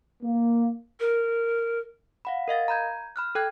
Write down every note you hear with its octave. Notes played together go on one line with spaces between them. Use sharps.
A#3
A#4
F5 F#5 B5
A#4 D#5 F5 A6
A#5 B5 G6 G#6
B5 F6 F#6
A4 G5 F#6 G#6